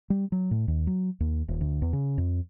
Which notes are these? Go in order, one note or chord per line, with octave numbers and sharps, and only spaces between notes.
G3
F#3
A2
D#2
F#3
D#2
D#1
D2
E2
C#3
F2